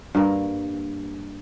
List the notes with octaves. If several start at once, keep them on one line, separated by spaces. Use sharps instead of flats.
G2 A#3 A#4